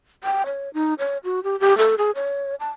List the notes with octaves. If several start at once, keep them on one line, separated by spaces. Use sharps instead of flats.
G5
C#5
D#4
C#5
F#4
G4
G4
A4
G#4
C#5
A5